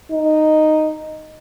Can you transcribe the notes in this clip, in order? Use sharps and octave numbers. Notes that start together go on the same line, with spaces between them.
D#4